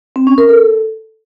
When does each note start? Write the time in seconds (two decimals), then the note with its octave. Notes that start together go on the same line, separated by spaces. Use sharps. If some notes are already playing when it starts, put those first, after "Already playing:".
0.16 C4
0.27 C#4
0.38 A#4
0.49 A4